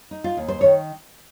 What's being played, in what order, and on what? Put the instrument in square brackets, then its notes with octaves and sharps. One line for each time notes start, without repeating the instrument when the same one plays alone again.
[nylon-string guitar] D#4
F4
D#2
C5
D#3 C#5